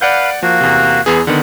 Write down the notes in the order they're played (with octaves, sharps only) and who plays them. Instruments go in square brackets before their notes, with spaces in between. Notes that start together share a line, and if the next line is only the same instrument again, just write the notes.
[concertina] B4 F5 [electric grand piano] D5 F#5 G6
[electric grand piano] F3 [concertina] A#3 F#4
[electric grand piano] E2 C3
E2 B3 G#4
[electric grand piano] D3 D#3 B3 [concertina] F#5